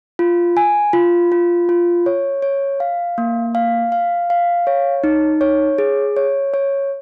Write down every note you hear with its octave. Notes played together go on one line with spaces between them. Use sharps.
F4
G#5
F4
F4
F4
C#5
C#5
F5
A#3
F5
F5
F5
C#5
D#4
C#5
G#4
C#5
C#5